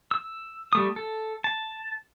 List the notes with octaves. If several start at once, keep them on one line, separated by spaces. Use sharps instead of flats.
E6
G3 A3 D#6
A4
A5